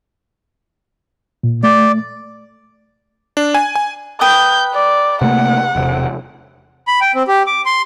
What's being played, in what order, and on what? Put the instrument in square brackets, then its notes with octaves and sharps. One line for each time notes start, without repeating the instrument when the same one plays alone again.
[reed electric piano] A#2
[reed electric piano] A3 [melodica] D5
[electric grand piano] D4
G#5
G#5
[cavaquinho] B4 G5 D#6 [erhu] G6
[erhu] D5
[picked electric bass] C3 A3 A#3 [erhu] F#5
[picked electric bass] E1 C3
[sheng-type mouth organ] B5
G5
C4
G4
D6
C6